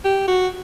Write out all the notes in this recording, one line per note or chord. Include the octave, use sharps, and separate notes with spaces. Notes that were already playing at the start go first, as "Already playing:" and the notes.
G4
F#4